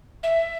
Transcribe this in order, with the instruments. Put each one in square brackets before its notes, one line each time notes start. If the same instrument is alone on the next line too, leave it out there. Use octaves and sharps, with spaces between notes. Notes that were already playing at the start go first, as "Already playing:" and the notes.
[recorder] E5